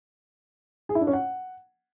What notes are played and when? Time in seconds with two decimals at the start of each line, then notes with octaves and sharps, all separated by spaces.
0.89 G#4
0.95 E4
1.01 D4
1.07 C#4
1.13 F#5